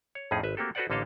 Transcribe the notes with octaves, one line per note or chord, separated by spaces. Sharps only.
C#5
F2 A2 C#4 D#4 G#4
G#1 B4 E5
A3 A#3 C4 F#4 G4 A4
F#4 A4 B4 C5 D5 F#5
A1 D3 A#3 A4 D#5 F5